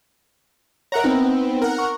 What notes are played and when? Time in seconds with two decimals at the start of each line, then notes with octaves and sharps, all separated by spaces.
0.92 A#4 C#5 E5 F#5 A#5
1.04 B3 C4 D#4
1.62 A#4 F#5
1.79 C#6